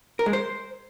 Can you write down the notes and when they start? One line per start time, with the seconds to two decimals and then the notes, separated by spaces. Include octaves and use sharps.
0.19 A#4
0.26 G#3
0.33 C5